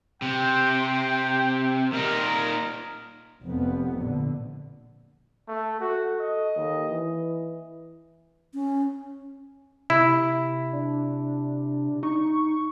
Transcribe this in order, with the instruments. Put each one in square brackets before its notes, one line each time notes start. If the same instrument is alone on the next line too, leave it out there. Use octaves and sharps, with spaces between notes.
[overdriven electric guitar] C3 [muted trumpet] G5
[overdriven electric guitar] A#2 D#4 [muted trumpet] A#4
[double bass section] F1 F2 B3
A#1 D3
[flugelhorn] A3
[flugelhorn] F#4 [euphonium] A4
[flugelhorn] D#5
[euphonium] D#2
E3
[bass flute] C#4
[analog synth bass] C3 [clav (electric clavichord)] E4
[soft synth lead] D4
[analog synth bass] D#4 [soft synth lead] C#6